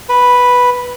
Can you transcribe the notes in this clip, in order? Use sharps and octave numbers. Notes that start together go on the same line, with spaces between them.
B4